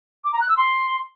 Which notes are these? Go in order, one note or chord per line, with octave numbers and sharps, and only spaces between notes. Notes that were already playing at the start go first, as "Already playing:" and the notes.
D6
A#5
F#6
E6
C6